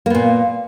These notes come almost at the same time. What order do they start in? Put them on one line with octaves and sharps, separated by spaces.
A#3 B3 A#2